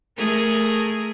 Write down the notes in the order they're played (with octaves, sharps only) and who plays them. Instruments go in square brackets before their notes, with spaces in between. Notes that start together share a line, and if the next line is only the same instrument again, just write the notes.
[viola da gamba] A3 G#4 A#4